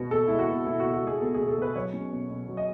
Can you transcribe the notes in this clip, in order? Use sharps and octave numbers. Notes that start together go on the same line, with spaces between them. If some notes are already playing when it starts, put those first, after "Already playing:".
Already playing: B2 G#3 B3 F#4
B2 A4
G#3 E4
F#4
B3
B2 E4
F#4
B2
F#4
G#3 G#4
B3 A4
B2 G#4
A4
B2 B4
F#3 C#5
C#4
B2
B2
F#3
D#5